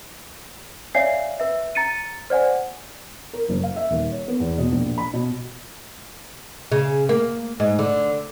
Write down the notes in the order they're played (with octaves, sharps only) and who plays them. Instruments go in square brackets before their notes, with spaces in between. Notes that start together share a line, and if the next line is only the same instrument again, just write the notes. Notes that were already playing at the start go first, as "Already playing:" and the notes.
[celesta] C#5 D5 E5 F5 G#5 C7
B4 E5
A#5 A6 C#7 D#7
C5 D5 F#5 G#5
[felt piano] A#4
F#1
F5
E5
D#1
C#5
B3
E2
B2
A#1
B5
B2
[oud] C#3
A#3
G#2
D3